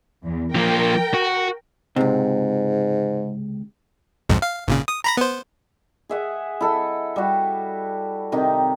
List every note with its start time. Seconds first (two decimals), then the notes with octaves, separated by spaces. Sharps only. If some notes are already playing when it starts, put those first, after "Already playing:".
0.25 E2
0.55 F3 A#3 A#4 G5
1.14 F#4
1.96 C#2 G#2 C3
4.29 B1 F2 G#2
4.42 F5
4.68 G#1 A#2 C#3
4.88 D#6
5.04 A#5 B5 A#6
5.17 B3 C5
6.09 G#4 E5 F#5
6.61 E4 A4 D#5
7.16 G3 F#4
8.32 C3 D#3 D#4 G4